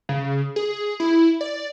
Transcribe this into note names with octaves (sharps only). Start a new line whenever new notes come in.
C#3
G#4
E4
D5